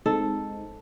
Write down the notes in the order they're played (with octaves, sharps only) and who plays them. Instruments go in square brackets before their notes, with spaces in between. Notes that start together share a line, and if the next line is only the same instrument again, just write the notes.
[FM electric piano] G#3 C4 D#4 [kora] A4